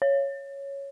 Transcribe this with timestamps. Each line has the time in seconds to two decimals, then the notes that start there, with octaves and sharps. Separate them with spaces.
0.02 C#5